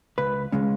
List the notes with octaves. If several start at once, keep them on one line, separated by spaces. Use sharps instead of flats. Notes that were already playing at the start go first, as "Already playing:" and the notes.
C#2 B4
C#3 G#3 C#4